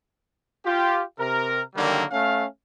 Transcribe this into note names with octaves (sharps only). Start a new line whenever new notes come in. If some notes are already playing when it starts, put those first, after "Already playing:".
F4 G4
C3 A#4
D3 D#3 F#3 G3 A#3
A3 C#4 F5